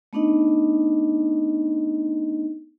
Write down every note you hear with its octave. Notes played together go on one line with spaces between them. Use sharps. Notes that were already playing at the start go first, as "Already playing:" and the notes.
A3 B3 D4 D#4 D#5